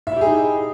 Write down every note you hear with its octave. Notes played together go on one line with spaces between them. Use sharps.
D#4 E4 G4 G#4 E5